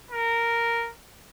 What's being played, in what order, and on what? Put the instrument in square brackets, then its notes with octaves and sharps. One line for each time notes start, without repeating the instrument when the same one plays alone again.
[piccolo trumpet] A#4